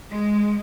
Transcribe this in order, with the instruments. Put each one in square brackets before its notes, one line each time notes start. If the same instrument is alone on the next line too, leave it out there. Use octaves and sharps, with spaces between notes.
[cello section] G#3